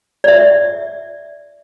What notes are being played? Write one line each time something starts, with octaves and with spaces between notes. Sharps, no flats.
D5 E5